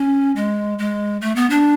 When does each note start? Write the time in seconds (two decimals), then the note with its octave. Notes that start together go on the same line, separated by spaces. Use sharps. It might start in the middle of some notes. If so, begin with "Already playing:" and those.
Already playing: C#4
0.36 G#3
0.79 G#3
1.21 A3
1.36 B3
1.50 D4